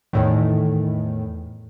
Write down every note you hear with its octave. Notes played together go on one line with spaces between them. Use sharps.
E2 A2 D#3